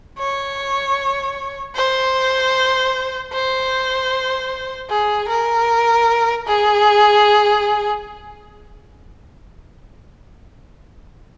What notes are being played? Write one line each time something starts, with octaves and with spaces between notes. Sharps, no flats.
C#5
C5
C5
G#4
A#4
G#4